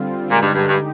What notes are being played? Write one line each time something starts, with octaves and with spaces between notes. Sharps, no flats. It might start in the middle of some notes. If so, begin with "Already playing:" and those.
Already playing: D3 G3 C4 F4
A#2 D3 G#3 D#4 G4
G2
G2
G2